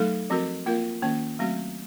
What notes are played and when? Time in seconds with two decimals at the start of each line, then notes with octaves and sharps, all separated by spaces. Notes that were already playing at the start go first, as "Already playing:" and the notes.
Already playing: F#3 A3 D#4 A4
0.30 F3 C4 F#4 A#4
0.66 A#3 F4 A#4 F5
1.02 D#3 A#3 C#4
1.39 F#3 A3 C4 F#4